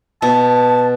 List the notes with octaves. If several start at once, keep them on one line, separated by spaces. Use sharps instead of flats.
B2 A5